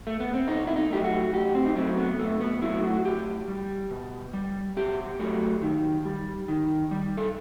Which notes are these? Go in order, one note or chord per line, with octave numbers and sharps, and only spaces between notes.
A3
B3
C4
B2 D#4
E4
D#4
F#3 A3 G4
F#4
A2 G4
C4
D#4
F#3 A3 C4
B3
C3 A3
B3
F#3 A3 E4
F#4
A2 G4
G3
B2
G3
B2 G4
F#3 A3
D#3
G3
D#3
G3
A4